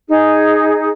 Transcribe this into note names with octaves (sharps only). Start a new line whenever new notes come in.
D#4 G#4